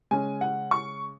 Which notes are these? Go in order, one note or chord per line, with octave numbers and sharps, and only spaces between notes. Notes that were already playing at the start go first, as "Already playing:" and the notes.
C#3 G#3 C#4 G#5
F#5
C#6